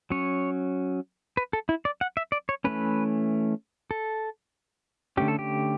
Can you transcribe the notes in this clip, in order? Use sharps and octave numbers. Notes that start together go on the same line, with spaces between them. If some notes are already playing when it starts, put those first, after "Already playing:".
F#3 C#4 C#5
B4
A4
E4
D5
F#5
E5
D5
C#5
E3 A3 C#4 B4
A4
D3 A3 C#4 G4
A4
G4